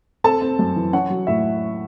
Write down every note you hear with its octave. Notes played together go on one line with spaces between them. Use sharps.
C4 A4 A5
C4
F#2
E3
C#4 F#5
F#3
A2 E5